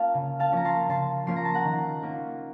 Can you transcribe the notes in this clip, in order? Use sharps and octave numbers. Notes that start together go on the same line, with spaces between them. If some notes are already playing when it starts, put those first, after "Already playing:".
Already playing: A#3 C#4 F4 F5 A5
C#3
F5 A5
F3 A#3 C#4 F4 A#5
A5 C6
C#3 A5 C6
F3 A#3 C#4 F4 C6
A#5
A5
F#5 A#5
D#3
A#3 C#4 F4